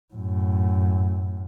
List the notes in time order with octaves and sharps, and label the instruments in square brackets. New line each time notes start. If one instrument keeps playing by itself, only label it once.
[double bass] F#2 A2